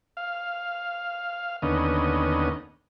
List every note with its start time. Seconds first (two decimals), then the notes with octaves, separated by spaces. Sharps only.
0.17 F5
1.62 D#2 D3 B3 C#4 D#5